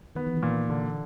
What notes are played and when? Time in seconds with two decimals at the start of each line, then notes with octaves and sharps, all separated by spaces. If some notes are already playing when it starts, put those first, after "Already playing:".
0.15 D#3 B3
0.26 E3
0.37 D#3
0.43 A#2
0.70 D3